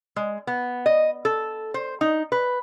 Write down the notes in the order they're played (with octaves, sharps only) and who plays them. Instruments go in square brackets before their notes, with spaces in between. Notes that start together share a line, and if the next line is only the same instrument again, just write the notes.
[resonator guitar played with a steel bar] G#3
B3
D#5
A4
C5
D#4
B4